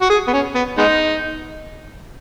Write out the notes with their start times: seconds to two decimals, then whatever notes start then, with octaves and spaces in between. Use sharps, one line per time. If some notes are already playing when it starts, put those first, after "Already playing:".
0.02 F#4
0.10 G#4
0.27 B3
0.33 C#4
0.55 B3
0.78 G#3 B3 D#4